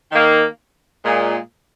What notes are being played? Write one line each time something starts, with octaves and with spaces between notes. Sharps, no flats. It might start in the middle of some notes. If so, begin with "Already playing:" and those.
D#3 A#3
A#2 G#3